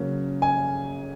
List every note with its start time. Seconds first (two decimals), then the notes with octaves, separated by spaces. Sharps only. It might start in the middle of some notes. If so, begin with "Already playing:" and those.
Already playing: C#3 F#3 A#3 C#4
0.42 G#5